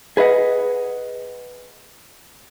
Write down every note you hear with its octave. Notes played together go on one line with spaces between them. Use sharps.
G#4 B4 D#5 E5 F#5